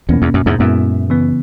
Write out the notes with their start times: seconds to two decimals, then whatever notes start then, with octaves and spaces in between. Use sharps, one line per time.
0.09 E2 B2 A#3 C#4
0.22 E2
0.34 F#2
0.46 E2 G#2
0.59 F#2 A#2 G#3 B3 E4
1.10 C#3 E3 B3